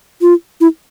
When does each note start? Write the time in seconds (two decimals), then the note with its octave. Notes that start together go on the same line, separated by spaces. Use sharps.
0.21 F4
0.61 E4